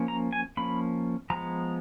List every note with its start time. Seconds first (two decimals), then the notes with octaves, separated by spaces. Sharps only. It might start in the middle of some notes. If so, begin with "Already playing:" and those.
Already playing: F3 A#3 C#4
0.08 A#5
0.33 G#5
0.57 F3 A#3 C#4 B5
1.30 F3 G#3 B3 A#5